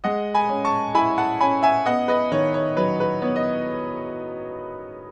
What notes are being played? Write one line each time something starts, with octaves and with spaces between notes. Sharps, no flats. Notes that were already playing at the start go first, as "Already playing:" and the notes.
G#3 D#5 F#5
G#5 B5
C#4
A5 C#6
E4 G#5 B5
F#5 A5
C#4 G#5 B5
E5 G#5
B3 D#5 F#5
B4 D#5
D#3 C#5
C#5
F#3 B4
B4
B3 C#5
D#5